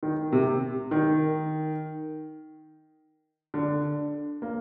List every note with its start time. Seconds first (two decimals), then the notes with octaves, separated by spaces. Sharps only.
0.03 D#3
0.32 C3
0.91 D#3
3.54 D3
4.42 A#3